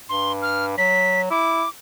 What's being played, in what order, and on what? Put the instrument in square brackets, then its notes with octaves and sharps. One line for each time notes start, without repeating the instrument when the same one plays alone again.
[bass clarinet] G2 [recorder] C6
[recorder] F6
[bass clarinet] F#3 [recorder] B6
[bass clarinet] E4 [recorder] D6